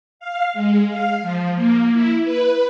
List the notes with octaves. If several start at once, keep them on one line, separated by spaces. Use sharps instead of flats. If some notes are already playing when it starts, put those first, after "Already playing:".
F5
G#3
F5
F3
A#3
E4
B4